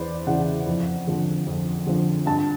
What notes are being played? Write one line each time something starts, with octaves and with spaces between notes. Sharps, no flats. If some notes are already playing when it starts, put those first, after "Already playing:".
Already playing: E2 E3 B4 C5 D5
C#3 E3 F#5
F2
D3 F3
F2
D3 F3
G2 A5